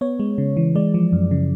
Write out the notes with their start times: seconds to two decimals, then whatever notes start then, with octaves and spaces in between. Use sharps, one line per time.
0.01 B3 C#5
0.20 G#3
0.38 C#3
0.57 E3
0.75 G#3 D5
0.94 F3
1.13 F#2
1.31 C#3